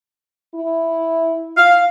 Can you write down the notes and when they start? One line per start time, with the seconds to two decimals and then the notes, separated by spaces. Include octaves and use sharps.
0.55 E4
1.57 F5